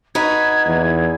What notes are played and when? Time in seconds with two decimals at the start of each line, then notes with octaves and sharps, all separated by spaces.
0.15 D#4 F#4 B4 G#6
0.66 E2